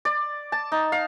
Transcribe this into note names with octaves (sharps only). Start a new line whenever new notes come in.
D5
A5
D#4
F5